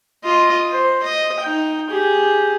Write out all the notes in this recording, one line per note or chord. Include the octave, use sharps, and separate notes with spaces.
F4 D#5
C5
D#5
D#4 G5
G4 G#4